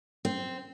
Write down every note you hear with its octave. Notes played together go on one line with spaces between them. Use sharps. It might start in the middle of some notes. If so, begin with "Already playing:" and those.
C4